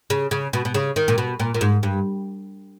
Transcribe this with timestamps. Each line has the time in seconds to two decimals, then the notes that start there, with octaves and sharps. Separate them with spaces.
0.10 C#3
0.31 C#3
0.53 B2
0.65 B2
0.74 C#3
0.96 D#3
1.08 A#2
1.18 B2
1.40 A#2
1.54 A#2
1.61 G#2
1.83 G2